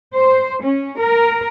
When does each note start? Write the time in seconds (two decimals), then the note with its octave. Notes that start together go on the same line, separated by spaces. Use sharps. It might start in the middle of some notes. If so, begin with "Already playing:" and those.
0.14 C5
0.61 C#4
0.98 A#4